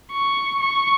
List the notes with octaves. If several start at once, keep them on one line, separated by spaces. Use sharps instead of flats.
C#6
C#6